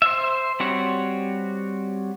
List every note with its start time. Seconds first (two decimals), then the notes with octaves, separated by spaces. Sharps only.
0.02 C5 E5
0.60 G3 C4 F#4 C#5